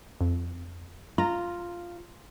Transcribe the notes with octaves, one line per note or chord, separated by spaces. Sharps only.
F2
F4 A#5